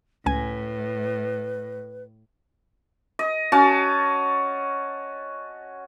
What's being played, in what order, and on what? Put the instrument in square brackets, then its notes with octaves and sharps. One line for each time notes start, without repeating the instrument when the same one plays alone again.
[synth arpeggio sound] C#2 G#5 [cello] A2 [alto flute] B4
[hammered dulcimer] D#5
C#4 F#4 A5